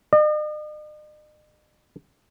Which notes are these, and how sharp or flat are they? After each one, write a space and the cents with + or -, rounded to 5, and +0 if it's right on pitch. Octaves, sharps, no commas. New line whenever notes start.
D#5 -45